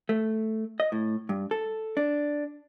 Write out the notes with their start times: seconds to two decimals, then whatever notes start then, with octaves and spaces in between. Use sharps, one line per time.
0.09 A3
0.80 D#5
0.92 A2
1.29 G2
1.51 A4
1.97 D4